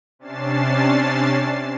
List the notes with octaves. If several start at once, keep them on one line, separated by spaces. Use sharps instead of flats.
C3 C#4 D4 A6 C7 E7